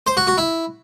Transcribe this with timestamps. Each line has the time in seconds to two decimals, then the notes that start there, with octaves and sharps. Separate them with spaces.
0.07 C5
0.17 F#4
0.27 F#4
0.38 E4